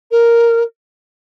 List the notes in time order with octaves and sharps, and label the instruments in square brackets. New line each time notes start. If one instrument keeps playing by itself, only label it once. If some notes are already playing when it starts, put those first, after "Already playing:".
[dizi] A#4